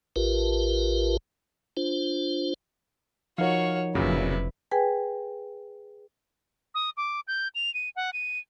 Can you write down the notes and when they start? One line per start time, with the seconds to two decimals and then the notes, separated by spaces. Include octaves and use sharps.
0.16 A1 F4 G4 A#4 B4
1.77 D4 F4 C5
3.38 F3 D#4 F#4 A#4 C#5 F5
3.95 F1 F2 A#2 C#3 F#3 E4 B4
4.71 G#4 B4 G5 G#5
6.75 D#6
6.97 D6
7.28 G6
7.55 F7
7.74 D#7
7.96 F#5
8.13 D#7